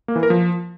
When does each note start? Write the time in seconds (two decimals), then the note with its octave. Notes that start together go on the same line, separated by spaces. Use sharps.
0.08 A#3
0.16 E3
0.23 A#4
0.30 F3